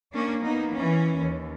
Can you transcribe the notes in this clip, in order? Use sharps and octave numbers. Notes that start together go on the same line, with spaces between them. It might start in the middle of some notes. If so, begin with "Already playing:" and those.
A#3 C#4 D4
A#3 B3 D#4
E3 C#4
D#2